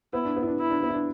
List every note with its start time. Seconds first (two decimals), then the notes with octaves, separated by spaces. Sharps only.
0.13 B3 E4
0.25 D4
0.36 B3
0.42 E4
0.47 D4
0.60 E4
0.71 D4
0.82 B3
0.89 E4
0.94 D4